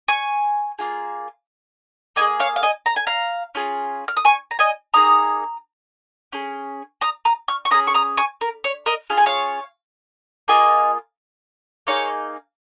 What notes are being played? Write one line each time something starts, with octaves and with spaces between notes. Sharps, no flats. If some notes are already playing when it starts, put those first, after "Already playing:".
G#5 C#6
A#3 F4 G#4
A#3 F4 G#4 D#5 G#5
C#5 F5
F5
D#5 G#5
A#5
G#5
F5 A#5
C#4 F4 G#4
F6
D#6
G#5 C#6
A#5
D#5 G#5
A#3 D#4 G#4 A#5 D#6
C#4 G#4
A#5 D#6
A#5 D#6
C#6 F6
C#6
C#4 G#4 A#5 D#6
C#6
A#5 D#6
G#5 C#6
A#4
C#5
A#4 D#5
C#4 F4 G#4 F5
G#5
C#5 F5
A#3 F4 G#4 D#5 G#5
A#3 D#4 G#4 C#5 F5